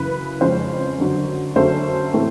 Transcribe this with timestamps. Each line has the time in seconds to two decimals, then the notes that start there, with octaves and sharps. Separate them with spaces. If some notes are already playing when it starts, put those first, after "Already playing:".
Already playing: F#2 C#3 E3 B4
0.41 F2 C#3 F3 G#3 C#4 C5
0.98 F#2 D3 F#3
1.56 F#2 D3 F#3 A3 C#4 C5
2.13 A2 E3 A3 C4